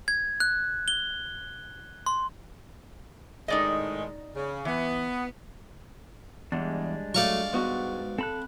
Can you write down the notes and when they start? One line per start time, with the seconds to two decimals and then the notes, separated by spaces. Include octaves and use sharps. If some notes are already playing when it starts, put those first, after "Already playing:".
0.08 G#6
0.40 F#6
0.88 G7
2.06 C6
3.48 A2 D#3 G#3 D#4 D5 D#5
4.35 C#3
4.65 E3 B3
6.52 E2 G3 G#3 D4
7.14 F#3 A3 D5 F5 C#6
7.53 G#2 B3 F#4
8.18 C4 A4 B5 F#6